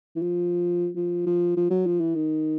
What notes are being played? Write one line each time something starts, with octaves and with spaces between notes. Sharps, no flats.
E3
F3
F3
F3
F3
F#3
F3
E3
D#3